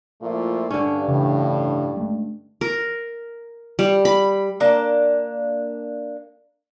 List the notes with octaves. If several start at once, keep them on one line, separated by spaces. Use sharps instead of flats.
A#2 F3 A3 E4
G2 D3 C#4 D4
A2 C#3 E3
G#3 A3
A#4
G3
B5
A#3 D4 F5